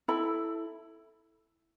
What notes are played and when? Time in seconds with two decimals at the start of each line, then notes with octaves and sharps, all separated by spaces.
0.08 E4 A4 B5